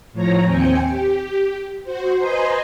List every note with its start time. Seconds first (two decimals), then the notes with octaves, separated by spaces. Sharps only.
0.13 A2 F3 C#5 A#5 A#6
0.45 D#2 C4 G5 G#5 C#7
0.87 G4
1.84 F#4 C5
2.17 B4 C5 D#5 G#5 A#5 C6